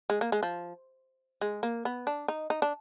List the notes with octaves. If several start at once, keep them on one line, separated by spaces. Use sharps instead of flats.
G#3
A#3
G#3
F3
G#3
A#3
B3
D4
D#4
D#4
D4